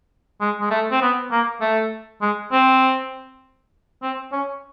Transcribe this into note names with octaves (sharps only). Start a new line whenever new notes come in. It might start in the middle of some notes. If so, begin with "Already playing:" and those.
G#3
G#3
A3
C4
B3
A#3
A3
G#3
C4
C4
C#4